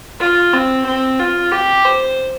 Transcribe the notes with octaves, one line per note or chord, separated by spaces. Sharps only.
F4
C4
C4
F4
G4
C5